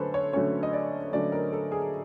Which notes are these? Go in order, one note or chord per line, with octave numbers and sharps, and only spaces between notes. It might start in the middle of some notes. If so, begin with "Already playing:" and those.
Already playing: D3 F#3 A3 C#4 A4 B4 C5
C#5
D3 F#3 A3 C#4 C#5
D#5
D5
D3 F#3 A3 C#4 D5
A#4
A4
G#4